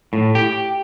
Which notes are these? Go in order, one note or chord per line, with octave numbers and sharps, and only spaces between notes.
A2
G4